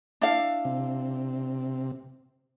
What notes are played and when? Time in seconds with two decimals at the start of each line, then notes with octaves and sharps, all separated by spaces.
0.21 D4 E4 F5
0.65 C3